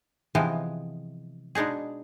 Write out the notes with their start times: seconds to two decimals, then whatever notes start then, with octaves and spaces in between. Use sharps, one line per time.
0.35 C3 E3 F3 G#3 B3
1.55 B2 G#3 D4 D#4 G#4